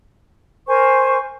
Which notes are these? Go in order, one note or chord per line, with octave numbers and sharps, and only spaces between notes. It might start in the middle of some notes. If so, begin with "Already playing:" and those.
A#4 C5 G#5 C#6